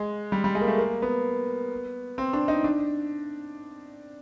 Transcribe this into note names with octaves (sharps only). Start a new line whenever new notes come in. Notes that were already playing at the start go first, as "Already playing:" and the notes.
Already playing: G#3
G3
G3
G#3
A#3
A3
A#3
B3
C4
D4
D#4
D4